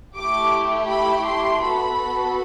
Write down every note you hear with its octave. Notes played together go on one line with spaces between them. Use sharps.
A3 E4 G4 D6
B5
C6
B3 F#4 A4 B5